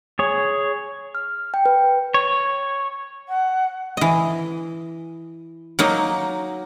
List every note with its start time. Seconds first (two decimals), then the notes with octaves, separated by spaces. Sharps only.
0.19 G#4 C#5
1.15 F6
1.54 G5
1.66 B4
2.14 C#5
3.29 F#5
3.97 E3 D#5
5.79 F#3 A#3 D#4